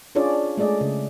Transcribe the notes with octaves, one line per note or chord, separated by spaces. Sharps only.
C#4 D4 F4 G#4 C#5 D5
G#3 A3 G#4 D5 D#5
C#3